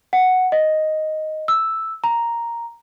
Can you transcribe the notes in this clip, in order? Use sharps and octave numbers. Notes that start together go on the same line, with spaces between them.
F#5
D#5
E6
A#5